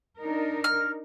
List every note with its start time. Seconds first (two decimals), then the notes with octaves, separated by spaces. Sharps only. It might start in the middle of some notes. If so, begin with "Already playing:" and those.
0.19 D4 D#4 A#4
0.64 F6